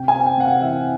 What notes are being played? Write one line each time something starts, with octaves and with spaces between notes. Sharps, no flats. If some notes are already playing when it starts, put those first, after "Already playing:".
Already playing: C3 G5
G#5
C4
G5
C3 F#5
F5
E3 E5